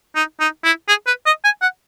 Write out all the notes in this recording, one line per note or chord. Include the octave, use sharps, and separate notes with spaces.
D#4
D#4
E4
G#4
B4
D#5
G#5
F#5